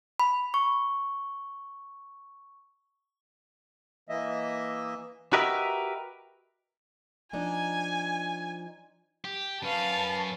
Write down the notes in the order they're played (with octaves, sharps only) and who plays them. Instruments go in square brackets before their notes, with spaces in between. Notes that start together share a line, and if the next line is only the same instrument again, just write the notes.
[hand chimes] B5
C#6
[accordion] E3 A#3 D#5 E5
[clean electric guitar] F#4 G4 A#4 B4 D#5 E5
[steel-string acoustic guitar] F3 D4 D#4 [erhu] G#5
[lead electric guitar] G4
[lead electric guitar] F#2 C#4 [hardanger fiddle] B4 F5 [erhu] A5